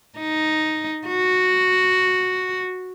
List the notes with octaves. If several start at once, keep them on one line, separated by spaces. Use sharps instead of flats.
D#4
F#4